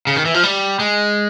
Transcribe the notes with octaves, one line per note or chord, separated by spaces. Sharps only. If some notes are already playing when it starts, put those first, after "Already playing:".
C#3
D#3
E3
F3
G3
G#3